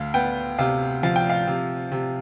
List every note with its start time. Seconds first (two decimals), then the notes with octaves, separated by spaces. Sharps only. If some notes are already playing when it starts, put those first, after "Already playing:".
Already playing: D2 F5
0.14 B3 G5
0.59 C3 F5
1.03 F3 F5
1.16 G5
1.30 F5
1.47 C3
1.92 C3